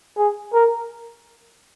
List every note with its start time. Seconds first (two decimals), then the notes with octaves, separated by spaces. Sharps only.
0.18 G#4
0.53 A#4